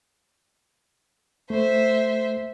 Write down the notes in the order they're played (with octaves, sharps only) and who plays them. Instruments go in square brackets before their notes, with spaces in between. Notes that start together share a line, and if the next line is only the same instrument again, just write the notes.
[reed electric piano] A3 [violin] C5 E5